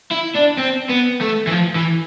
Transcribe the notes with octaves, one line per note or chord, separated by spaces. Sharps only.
E4
D4
C4
B3
A3
E3
F3
E3